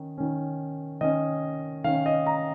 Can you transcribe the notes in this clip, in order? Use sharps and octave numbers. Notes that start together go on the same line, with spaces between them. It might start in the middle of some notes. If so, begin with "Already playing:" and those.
Already playing: D#3 C#4
D#3 C#4
D#3 C#4 D#5
D#3 C#4 F5
D#5
A#5